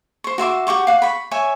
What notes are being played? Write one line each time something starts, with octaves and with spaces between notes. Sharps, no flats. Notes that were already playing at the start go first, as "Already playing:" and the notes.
C5 C#6
F#4 E5 C6 D6
G4 F#5 C#6 D6
F5 F#5
B5 C#6
C#5 E5 G#5 C#6